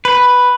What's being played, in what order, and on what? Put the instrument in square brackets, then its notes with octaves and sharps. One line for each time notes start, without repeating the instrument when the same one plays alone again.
[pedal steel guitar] B4